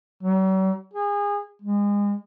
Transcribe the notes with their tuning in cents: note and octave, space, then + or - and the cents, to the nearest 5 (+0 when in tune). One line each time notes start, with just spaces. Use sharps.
F#3 +45
G#4 -30
G#3 -30